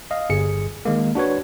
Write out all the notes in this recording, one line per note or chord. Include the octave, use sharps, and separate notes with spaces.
D#5 F5
G1 G#4 C#7
D#3 G#3 A#3
D4 F#4 B4 C#5